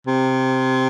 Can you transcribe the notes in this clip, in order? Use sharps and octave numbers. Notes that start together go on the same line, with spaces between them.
C3